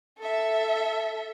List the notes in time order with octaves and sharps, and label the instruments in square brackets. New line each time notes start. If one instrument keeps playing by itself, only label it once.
[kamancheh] A4 E5